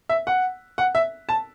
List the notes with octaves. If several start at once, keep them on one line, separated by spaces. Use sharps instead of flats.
E5
F#5
F#5
E5
A5